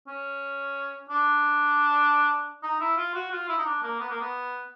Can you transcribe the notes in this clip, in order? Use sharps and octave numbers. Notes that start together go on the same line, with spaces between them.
C#4
D4
D#4
E4
F4
F#4
F4
E4
D#4
D4
A#3
B3
A#3
B3